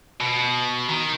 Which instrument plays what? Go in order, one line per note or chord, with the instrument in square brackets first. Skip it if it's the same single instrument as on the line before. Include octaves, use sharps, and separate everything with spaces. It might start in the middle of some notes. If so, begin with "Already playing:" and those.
[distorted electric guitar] B2
D#3